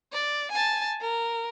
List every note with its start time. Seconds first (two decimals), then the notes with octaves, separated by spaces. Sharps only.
0.13 D5
0.52 G#5 A5
1.01 A#4